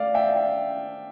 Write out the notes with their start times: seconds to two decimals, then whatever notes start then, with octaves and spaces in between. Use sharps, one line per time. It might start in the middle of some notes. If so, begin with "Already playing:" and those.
Already playing: A3 D5 F5
0.14 E5 G5